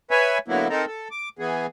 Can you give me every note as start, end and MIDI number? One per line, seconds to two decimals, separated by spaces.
0.11 0.38 71
0.11 0.38 73
0.11 0.38 76
0.11 0.38 80
0.48 0.68 50
0.48 0.68 54
0.48 0.68 58
0.48 0.68 59
0.48 0.68 64
0.69 0.85 60
0.69 0.85 63
0.69 0.85 69
0.69 0.85 70
0.87 1.08 69
1.11 1.29 86
1.39 1.66 52
1.39 1.66 59
1.39 1.66 68